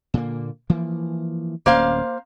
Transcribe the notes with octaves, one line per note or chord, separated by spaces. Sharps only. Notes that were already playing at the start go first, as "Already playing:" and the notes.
A#2 D3 A#3
E3 F3 A#3
D1 A#3 C#4 C5 F5